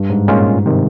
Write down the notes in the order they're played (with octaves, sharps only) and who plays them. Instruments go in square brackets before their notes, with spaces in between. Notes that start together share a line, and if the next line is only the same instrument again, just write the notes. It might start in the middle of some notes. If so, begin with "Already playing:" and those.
Already playing: [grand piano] G2
G#2
[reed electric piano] A#2 G#3 C#4 F4
C3 D#3